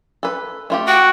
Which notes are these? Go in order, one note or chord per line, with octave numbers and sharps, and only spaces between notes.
A4 B4
A3 F4 G4
F#4 G5